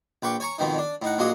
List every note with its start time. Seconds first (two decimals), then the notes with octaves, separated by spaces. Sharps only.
0.22 A#1 B4 G5 C#6 D6
0.40 C#5 G#5 A#5 C#6
0.58 F2 G#2 B2 D#3 D#4
0.78 D4
1.02 A2 D#4 F#5
1.18 A#1 F#3 G#3 A#3 F#4 D#6